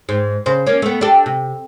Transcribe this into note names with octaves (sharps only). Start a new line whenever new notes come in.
G#2
C#3 C5
A#3 C#4
A3 B3
D4 G4 A4
C3